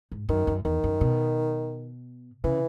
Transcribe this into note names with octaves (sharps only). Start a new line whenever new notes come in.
G#2
F#2 D#3
F#2
E2 D#3
F#2
B2
C#3 E3